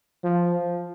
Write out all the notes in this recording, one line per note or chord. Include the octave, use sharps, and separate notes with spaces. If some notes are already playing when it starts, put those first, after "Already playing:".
F3